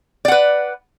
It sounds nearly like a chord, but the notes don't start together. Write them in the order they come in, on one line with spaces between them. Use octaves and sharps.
D5 F#5 B4